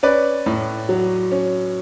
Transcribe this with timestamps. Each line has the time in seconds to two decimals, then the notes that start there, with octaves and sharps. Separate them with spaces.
0.03 C#4 B4 D5
0.46 A2
0.89 F#3
1.32 C#4